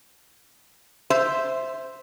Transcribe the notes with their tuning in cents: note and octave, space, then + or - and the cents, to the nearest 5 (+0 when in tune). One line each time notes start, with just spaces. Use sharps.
C5 +0 E5 +0